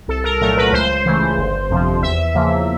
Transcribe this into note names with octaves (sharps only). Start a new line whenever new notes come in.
C2 A4
A#4
A#2 F#3 A3 A#4
B4
C#2 C5
C#3 E3 A3
G1
F2 C3 F3
E2 E5
C#3 F3 A#3